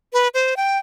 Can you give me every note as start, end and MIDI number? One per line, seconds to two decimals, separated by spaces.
0.13 0.28 71
0.34 0.54 72
0.57 0.78 79